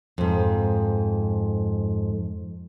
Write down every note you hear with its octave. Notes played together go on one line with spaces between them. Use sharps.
F2 G#2